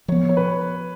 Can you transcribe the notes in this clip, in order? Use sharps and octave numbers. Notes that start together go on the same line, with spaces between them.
F3 B3 C#5
C#5
B4